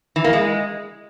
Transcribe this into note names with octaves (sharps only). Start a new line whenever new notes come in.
E3
A#3
G#3